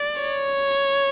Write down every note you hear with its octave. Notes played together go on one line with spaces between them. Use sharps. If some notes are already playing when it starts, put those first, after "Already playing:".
Already playing: D5
C#5